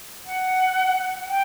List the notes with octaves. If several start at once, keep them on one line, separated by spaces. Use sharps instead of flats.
F#5
G5